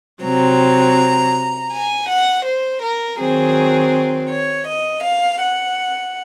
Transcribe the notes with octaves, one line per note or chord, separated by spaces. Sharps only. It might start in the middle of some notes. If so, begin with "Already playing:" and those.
C3 F#3 C4 A#5
G#5
F#5
C5
A#4
D#3 F#3 C4 G#4
C#5
D#5
F5
F#5